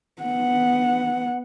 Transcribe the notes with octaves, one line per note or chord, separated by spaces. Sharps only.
B3 F#5